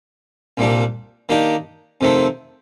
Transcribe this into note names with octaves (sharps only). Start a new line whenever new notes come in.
C2 A#2 G3 D4
D#3 A#3 D4 G4
F2 C3 D#3 A3 C4